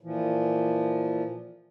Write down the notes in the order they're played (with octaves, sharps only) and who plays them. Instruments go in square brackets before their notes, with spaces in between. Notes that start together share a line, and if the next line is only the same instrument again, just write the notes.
[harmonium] A#2 E3 F3